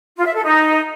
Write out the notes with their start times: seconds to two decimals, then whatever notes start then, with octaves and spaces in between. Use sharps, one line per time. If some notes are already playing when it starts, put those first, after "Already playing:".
0.17 F4
0.26 E5
0.35 A4
0.44 D#4